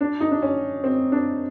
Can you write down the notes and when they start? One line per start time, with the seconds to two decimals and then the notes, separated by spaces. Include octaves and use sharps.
0.01 D4
0.20 D#4
0.31 D4
0.42 C#4
0.84 C4
1.12 D4